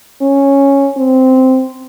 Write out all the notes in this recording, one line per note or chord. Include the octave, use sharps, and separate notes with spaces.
C#4
C4